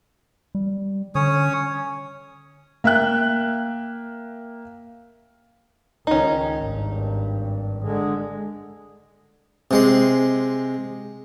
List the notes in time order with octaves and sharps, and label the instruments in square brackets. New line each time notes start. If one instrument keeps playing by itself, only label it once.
[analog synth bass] G3
[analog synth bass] D3 [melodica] C#4 C#5 D#6
[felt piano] A#3 E5 G5 F#6
[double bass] C#2 D#3 [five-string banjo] C#4 D#4
[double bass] G#1 G2
D3 G#3
[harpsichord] C3 G#3 C6